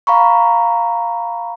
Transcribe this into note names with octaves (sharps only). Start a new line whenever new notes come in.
F5 A#5 B5 C#6